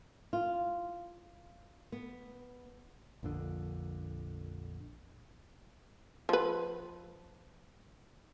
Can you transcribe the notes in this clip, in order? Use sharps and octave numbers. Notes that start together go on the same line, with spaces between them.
F4
B3
A#1 F2 D3
F3 B4